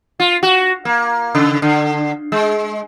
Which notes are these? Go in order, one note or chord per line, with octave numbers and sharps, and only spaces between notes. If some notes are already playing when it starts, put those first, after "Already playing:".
F4
F#4
A#3
C#3
D3
G#3